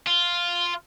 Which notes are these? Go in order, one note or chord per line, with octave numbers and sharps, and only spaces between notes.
F4